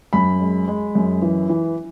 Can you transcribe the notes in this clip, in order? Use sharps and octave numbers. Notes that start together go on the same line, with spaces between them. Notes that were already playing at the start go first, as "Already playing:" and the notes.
F#2 B5
G#3
G#3
F#2
E3
E3